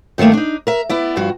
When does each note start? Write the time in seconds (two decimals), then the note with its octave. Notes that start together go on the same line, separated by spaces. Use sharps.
0.18 G2 D#3 F3 A3 A#3
0.33 D4 D#4
0.67 A#4 E5
0.89 B3 E4 D5
1.17 G2 F3 F#4